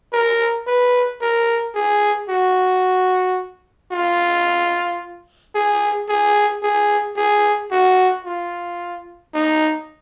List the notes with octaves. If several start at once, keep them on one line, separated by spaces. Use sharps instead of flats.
A#4
B4
A#4
G#4
F#4
F4
G#4
G#4
G#4
G#4
F#4
F4
D#4